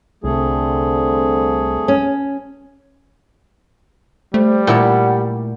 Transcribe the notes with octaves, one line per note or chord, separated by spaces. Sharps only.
C2 D3 A3 C4 G#4
C#4
G3 A3 C5
A#2 E4 C#5 F#5